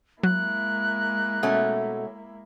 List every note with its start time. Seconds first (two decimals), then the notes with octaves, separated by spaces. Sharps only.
0.23 F#3 G#3 A#3 E4 F#6
1.43 B2 A3 C#4